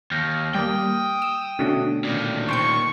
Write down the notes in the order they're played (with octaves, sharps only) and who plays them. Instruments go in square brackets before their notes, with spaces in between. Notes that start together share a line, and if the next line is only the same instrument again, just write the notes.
[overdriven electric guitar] D#2 [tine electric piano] F6 G6 A#6
[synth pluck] G3 A#3 [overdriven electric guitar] G5 [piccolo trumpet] D#6
[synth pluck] E6
[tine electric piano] B2 D3 A3 [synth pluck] C#4 D4 F#4
[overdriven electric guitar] A#2 D#3
[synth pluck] C5 G5 G6 [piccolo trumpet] C#6